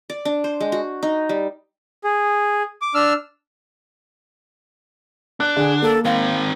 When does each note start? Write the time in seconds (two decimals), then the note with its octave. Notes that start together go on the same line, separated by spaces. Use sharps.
0.10 D5
0.25 D4
0.44 C5
0.60 G#3
0.72 F#4
1.03 D#4
1.29 G3
2.04 G#4
2.82 D6
2.94 D4 E6 F6
5.40 D4 F#6
5.56 D3 G#4
5.82 A#3 A4
6.05 D#3 C4 F5